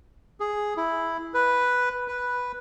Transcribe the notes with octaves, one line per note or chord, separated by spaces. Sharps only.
G#4
E4
B4
B4